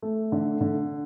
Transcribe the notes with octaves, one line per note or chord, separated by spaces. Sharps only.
A3
D3
D3